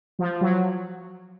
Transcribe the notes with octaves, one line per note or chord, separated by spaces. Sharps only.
F3
F#3